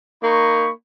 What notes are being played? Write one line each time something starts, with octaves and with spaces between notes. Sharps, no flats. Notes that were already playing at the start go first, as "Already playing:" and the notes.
A#3 D#4 B5 C#6